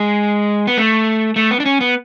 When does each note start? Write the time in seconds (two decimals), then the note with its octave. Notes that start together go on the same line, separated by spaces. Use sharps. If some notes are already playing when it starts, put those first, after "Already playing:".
Already playing: G#3
0.67 B3
0.77 A3
1.36 A3
1.51 B3
1.60 D4
1.66 C#4
1.81 B3